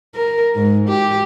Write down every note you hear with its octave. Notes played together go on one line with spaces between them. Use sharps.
A#4
G#2
G4